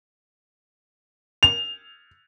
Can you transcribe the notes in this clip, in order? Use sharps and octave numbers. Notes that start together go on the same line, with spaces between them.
F7